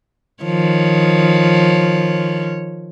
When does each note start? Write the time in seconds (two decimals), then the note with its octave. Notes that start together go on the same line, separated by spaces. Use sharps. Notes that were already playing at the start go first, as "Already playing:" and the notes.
0.44 D#3 F3 C#5